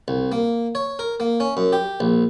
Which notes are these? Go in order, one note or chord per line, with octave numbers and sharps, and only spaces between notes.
C2
A#3
C#5
A#4
A#3
C#4
F#2
G4
A#1